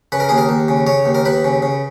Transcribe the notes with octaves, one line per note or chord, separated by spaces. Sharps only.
C#3 B4
A#4
D#2 G#4
A#4
D#2
C#3
C#3 C#5
D#2
A#4
D#2 B4
C#3
C#3